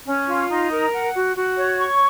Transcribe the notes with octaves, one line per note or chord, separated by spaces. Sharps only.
C#4
F4
D#4
A#4
F#5
F#4
F#4
C#5
C#6